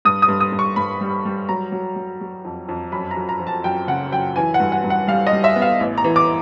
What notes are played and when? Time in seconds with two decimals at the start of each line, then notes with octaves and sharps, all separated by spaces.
0.05 G2 D#6
0.22 D#6
0.28 G2
0.40 D#6
0.52 G2
0.59 C#6
0.76 G2 B5
1.01 G3
1.25 G3
1.49 F#3 A#5
1.72 F#3
1.96 F#3
2.21 F#3
2.45 F2
2.69 F2
2.92 F#2 B5
3.11 A#5
3.17 F#2
3.29 A#5
3.40 F3
3.47 A5
3.64 F#2 G5
3.88 C#3 F#5
4.12 F#2 G5
4.36 E3 G#5
4.54 F#5
4.60 G2
4.72 F#5
4.84 G2
4.90 F#5
5.07 G3 F5
5.27 D#5
5.33 G3
5.44 E5
5.56 B3
5.62 F5
5.80 A1
5.98 A#5
6.04 E3
6.16 D6